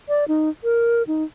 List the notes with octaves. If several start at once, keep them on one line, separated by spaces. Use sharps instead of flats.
D5
D#4
A#4
D#4